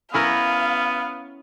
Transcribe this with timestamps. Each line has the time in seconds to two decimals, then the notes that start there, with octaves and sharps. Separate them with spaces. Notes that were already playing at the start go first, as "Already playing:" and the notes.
0.14 B3 C#4 E4 A#4 F5